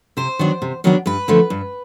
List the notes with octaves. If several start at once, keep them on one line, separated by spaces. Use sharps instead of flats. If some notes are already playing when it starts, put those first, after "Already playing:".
C3 C5
D#3 F#3 B3 D4
C3
D#3 F#3 B3 D4
G2 B4
D3 F3 A3
G2